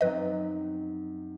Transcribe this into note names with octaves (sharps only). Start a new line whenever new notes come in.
F#2 F#3 C4 D#4 B4 D#5